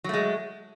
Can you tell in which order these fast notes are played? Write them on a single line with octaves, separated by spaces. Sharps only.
F#3 A3 G#3